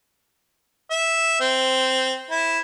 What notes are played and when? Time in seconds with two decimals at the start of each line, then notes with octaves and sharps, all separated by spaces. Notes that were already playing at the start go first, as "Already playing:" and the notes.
0.91 E5
1.40 C4
2.31 E4